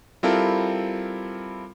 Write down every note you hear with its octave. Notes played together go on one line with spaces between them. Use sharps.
G3 C4 E4 F4 A4 A#4